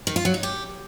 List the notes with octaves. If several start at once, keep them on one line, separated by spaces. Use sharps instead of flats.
D#3
F4
F#3
D#4
G4